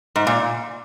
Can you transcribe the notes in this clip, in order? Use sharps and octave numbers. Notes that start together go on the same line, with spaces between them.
G#2
A#2